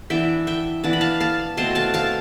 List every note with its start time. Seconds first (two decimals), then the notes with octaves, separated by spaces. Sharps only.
0.10 E3 B3 D4 E5 G5
0.47 E5 G5
0.84 E3 B3 D4 A5
0.93 B5
1.01 F5 A5
1.20 F5 A5
1.57 B2 A3 C4 A5 C6
1.75 F5 A5
1.94 F5 A5